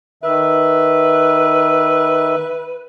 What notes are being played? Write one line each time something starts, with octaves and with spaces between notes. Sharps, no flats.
D#3 B4 E5